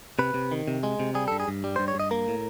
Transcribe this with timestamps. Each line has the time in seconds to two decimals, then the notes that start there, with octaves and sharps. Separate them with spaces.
0.19 C3 B4
0.34 C3
0.51 D#3
0.68 C3
0.83 G#3
1.00 C3
1.15 G3 G#4
1.28 A4
1.32 G2
1.40 G#4
1.48 G2
1.64 G3
1.76 G2 C5
1.88 C#5
1.95 G2 D#5
2.11 A#3 A#4
2.28 A2